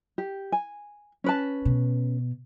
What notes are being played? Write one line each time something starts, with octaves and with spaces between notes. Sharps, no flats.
G4
G#5
C#4 B4 A5
B2